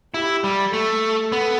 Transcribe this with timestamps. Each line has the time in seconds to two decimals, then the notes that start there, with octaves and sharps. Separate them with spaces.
0.14 E4 G4
0.44 G3
0.73 A3 A4
1.32 B3